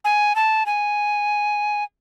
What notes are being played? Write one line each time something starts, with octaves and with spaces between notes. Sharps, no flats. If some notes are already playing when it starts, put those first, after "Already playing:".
G#5
A5
G#5